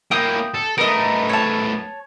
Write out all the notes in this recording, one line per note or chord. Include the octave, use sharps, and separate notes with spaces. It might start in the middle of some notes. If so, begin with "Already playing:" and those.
A#3 E4 G5 D#6 G6
A4
A3 B3 A#4 D#5
C#5 A5